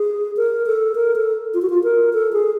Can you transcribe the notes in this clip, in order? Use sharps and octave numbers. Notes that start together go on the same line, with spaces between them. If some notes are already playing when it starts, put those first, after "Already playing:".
Already playing: G#4
A#4
A4
A#4
A4
F4
F#4
F4
A#4
A4
G#4